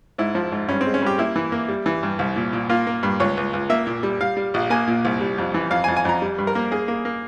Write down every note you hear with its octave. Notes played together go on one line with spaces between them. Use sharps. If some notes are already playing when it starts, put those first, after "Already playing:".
G#2 E4
F3
G#2
G2 C#4
G#3 C4
C#4
G2 G4
A#3 E4
E3
A#3
G3
E3
G2
C2
A#2
A#2
A#3 F4
A#3
G2
C#2 C#5
C#2
C#2
A#3 E5
A#2
G3
G3 F5
G3
A#1
A#3 G#5
A#2
C2
G3
F2
E3
F2 F5
G#5
F2
G#5
F2 A#5
G3
G2
A#4
A#3
A#3 G#4
A#3
A#3